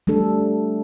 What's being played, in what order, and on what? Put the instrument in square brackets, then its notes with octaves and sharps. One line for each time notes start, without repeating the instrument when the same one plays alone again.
[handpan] G3 A3 D4 A4